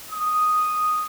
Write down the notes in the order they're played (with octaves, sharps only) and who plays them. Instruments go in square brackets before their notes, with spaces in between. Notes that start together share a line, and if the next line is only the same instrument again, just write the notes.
[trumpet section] D#6